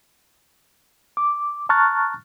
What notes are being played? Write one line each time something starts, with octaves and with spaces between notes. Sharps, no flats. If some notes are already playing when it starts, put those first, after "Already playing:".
D6
A5 A#5 C#6 F6 F#6 A6